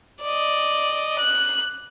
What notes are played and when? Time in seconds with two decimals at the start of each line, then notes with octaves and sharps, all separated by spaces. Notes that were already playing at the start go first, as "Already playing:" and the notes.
0.23 D5 D#5
1.19 F#6